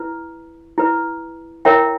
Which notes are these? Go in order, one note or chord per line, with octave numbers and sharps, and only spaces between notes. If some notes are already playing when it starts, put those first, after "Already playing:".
Already playing: E4 B4
E4 B4
E4 A#4 C#5 E5 G5